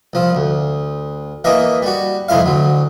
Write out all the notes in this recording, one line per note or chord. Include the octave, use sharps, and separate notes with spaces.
C2 F3
D2
E3 A#3 D#5 E5
G3 F#4
C2 F2 G#3 E4 F5
D2 F#3